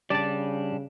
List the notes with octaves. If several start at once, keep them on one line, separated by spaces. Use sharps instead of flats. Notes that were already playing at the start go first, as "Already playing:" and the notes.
C#3 G3 D4 D5 A5